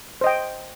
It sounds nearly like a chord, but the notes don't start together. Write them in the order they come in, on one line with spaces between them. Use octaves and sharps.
C5 D#5 G5